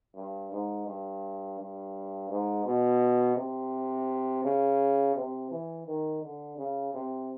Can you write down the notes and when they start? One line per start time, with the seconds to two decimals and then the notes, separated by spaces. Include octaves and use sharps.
0.16 G2
0.52 G#2
0.87 G2
1.59 G2
2.30 G#2
2.65 B2
3.37 C3
4.44 C#3
5.15 C3
5.51 E3
5.87 D#3
6.22 D3
6.58 C#3
6.94 C3